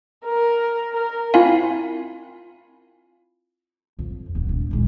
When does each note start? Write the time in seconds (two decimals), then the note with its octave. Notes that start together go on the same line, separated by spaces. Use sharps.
0.25 A#4
0.93 A#4
1.34 C4 E4 F4 F5 G#5
3.99 F2
4.35 D1 B3
4.49 E1
4.71 D#1 G#3